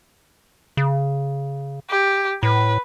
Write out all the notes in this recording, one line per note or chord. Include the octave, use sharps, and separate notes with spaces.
C#3
G4
A2 B4